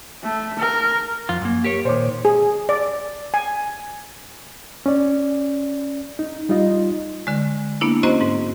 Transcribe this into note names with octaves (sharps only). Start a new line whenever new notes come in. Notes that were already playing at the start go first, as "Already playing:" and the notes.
A3
A#4
F2 F4
F#2 A#3
G4 A#4 C#5
A#2 D#3 C5 C#5 D6
G#4
D5
G#5
C#4 D5
D#4
G3 D#4 F4 D#5
D3 G#3
A#3 B3 D4 E4
C4 C#4 F#4 C5 D#5 A#5
G#2